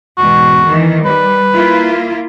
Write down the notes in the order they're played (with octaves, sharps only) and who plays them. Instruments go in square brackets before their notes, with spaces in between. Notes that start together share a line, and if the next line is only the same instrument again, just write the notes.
[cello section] E2 G#2 B2 [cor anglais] F#4
[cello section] D#3 E3
[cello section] G3 [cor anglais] B4
[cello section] A#3 E4 F4